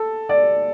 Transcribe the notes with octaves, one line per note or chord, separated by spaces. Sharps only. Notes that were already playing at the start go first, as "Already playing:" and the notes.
Already playing: A4
D5